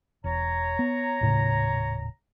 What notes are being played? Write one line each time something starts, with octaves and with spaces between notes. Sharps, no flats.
E1 C#5 A#5
B3
D#1 A2 C#3